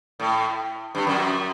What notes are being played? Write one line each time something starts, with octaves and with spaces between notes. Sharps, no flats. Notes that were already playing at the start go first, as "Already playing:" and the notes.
A2
G2
F#2